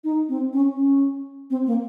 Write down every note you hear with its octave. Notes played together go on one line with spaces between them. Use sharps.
D#4
C4
C#4
C#4
C4
A#3